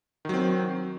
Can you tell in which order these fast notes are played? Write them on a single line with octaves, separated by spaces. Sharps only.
D#3 F#3 C4